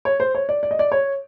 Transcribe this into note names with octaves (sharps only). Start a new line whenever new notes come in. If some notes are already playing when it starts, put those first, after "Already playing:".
C#5
C5
C#5
D5
D5
D#5
D5
C#5